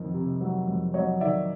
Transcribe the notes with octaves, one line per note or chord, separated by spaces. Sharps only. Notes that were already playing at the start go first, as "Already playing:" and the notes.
Already playing: F2 D#3
C3
F#3
F2
F#3 C#5 D#5
D#3 D5 E5